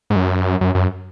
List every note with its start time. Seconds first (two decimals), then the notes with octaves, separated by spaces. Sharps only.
0.10 G#2
0.16 F#2
0.61 F#2
0.75 F#2